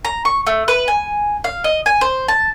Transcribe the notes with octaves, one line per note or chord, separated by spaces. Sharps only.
A#5
C#6
A3
B4
G#5
F5
D#5
G#5
C5
A5